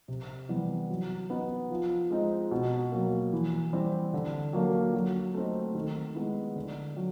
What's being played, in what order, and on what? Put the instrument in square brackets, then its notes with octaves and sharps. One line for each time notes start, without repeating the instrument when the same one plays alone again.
[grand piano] C3
E3 G3 B3
F#3
B3 D#4
F3
G#3 C4 D#4
B2
F#3 A#3
E3
G3 C4 E4
D3
F#3 A#3 D4
F#3
A3 C4 D#4
D#3
G#3 B3 E4
D3
F#3